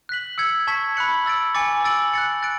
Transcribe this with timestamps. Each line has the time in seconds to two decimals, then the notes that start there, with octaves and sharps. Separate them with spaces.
0.09 F#6 B6 F#7
0.38 E6 G#6 C#7
0.67 A5 C#6 G#6 B6
0.97 B5 F#6 C#7 F#7
1.26 E6 A6 D7
1.55 G#5 D6 A6 C#7
1.84 E6 A6 D7 F#7
2.14 F#6 A6 C#7
2.42 F#6 A6 D7